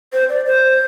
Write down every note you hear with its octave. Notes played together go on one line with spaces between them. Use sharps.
C5
D5
C5